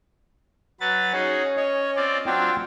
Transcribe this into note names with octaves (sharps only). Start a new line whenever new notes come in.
F#3 B4 A6
C#4 D#4 F#4 G#4
C#5 D#5
C4 F4 D5
F#3 C4 D4 F4 G5